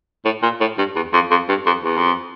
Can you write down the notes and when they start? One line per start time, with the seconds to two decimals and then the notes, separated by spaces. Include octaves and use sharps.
0.25 A2
0.42 A#2
0.60 A2
0.78 G2
0.96 E2
1.13 F2
1.31 F2
1.49 G2
1.66 F2
1.84 E2
1.97 F2